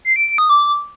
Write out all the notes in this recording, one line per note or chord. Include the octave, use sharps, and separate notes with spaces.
C7
D7
D7
D#6
D6